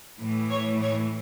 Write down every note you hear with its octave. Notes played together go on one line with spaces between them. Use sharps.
A2 E3
C#5
C#5